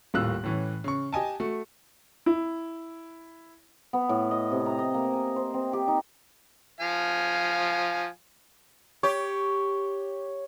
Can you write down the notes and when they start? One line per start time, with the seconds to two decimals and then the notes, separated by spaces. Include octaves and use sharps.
0.14 D#1 A2 A#3 F4 E6 F#6
0.44 A2 E3 C#4
0.84 C#3 C#6
1.13 G4 D#5 G#5 A5
1.40 A3 F#4
2.26 E4
3.93 B3
4.09 A2
4.31 D#5
4.51 C3
4.66 A#5
4.79 D#5
4.94 A#3
5.13 G#5
5.36 C5
5.54 C4
5.73 G4
5.88 D#4
6.80 F3 F5 G#5
9.03 G4 C#5